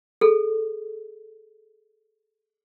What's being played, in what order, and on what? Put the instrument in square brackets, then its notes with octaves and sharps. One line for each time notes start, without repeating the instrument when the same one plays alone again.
[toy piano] G#4 A4